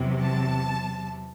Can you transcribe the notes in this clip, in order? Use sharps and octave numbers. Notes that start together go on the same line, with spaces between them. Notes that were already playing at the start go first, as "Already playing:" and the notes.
Already playing: E2 C3 F#3
A5